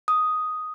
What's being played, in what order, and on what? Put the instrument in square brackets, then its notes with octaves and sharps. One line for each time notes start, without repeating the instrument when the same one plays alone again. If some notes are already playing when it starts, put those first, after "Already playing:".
[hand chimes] D#6